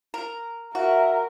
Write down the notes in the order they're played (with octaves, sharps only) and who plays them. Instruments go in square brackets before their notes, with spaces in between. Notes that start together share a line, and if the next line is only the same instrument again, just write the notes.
[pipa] A#4
[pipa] F#4 [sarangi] A#4 [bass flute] E5